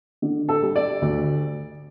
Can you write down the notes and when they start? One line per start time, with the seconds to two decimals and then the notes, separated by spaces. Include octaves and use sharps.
0.22 D3
0.49 A4
0.62 G3
0.76 D5
1.02 D2